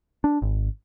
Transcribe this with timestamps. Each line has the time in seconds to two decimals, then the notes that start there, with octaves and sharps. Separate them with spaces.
0.24 D4
0.42 G#1